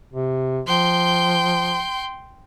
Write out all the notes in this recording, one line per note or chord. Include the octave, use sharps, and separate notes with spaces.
C3
F3 G5 C6